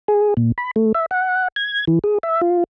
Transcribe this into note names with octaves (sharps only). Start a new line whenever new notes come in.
G#4
A#2
B5
A3
E5
F#5
G#6
E3
G#4
E5
F4